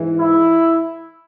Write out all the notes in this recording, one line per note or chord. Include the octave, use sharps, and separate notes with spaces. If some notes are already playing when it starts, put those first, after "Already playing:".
Already playing: G#2 E3
E4